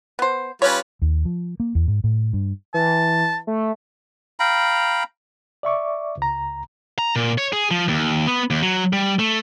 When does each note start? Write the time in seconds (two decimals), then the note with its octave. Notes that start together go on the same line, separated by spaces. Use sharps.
0.19 B3 C5
0.62 G3 C#4 F4 B4 C#5
1.02 D#2
1.25 F3
1.60 A#3
1.75 E2
1.88 G#2
2.04 A2
2.33 G2
2.74 E3 A5
3.47 A3
4.40 F5 G5 A#5 B5
5.63 D5 E5 C#6 D6
6.17 C#2 A#5
6.99 A#5
7.16 A#2
7.38 C#5
7.53 G#4
7.71 F3
7.88 D#2
8.27 B3
8.50 D#2
8.63 F#3
8.93 G3
9.19 A3